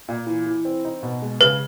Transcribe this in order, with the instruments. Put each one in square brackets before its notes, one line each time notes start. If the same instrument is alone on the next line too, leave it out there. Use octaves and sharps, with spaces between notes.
[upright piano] A#2
E3
E3
C4
D#4
B2
G#3
[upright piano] C#3 [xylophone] B4